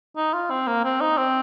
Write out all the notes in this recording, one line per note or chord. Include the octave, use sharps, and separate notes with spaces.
D#4
F4
C4
A#3
C4
D#4
C4